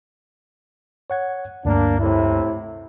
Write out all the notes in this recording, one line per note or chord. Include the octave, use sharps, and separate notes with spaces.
C#5 F#5 G#6
D2 G2 A#3 D4
A2 C3 E4